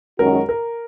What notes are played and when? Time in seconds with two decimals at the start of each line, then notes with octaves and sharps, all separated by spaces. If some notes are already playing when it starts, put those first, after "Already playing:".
0.18 F#2 D#3 G#3 C#4 F#4 A#4
0.49 A#4